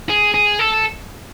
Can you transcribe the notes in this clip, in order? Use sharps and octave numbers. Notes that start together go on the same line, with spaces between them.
G#4
G#4
A4